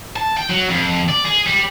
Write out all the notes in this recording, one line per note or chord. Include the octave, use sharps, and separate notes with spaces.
A5
G5
F#3
F2
D5
G#4
G3